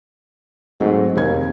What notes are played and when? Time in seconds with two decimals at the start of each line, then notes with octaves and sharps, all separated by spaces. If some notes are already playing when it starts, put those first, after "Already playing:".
0.80 G#2 F#3 A3 C4
1.16 F1 D#2 G#6